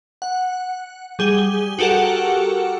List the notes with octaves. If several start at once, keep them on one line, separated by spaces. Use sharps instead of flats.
F#5
G3 G#4 G7
F#4 G4 A4 A#4 F#5